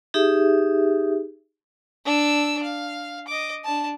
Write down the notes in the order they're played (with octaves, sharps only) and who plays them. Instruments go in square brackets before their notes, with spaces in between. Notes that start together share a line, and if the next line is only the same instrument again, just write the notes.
[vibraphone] D#4 G4 G#4 E5
[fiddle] D4 E6
F5
D#5 D6
D4 A5